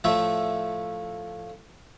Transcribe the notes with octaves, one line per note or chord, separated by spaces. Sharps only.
A2 F3 A3 E5